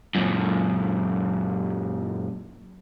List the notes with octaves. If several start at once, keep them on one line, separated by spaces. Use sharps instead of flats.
F#2 A#2